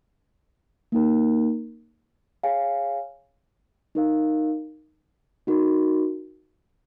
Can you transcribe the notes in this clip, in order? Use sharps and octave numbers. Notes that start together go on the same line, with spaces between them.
A#3 D#4 A#4
G#4 C#5 F5 G#5
D#4 A#4 F5
D#4 F#4 A#4